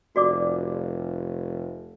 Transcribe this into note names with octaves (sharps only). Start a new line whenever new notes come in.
F1 F#4 D5 D6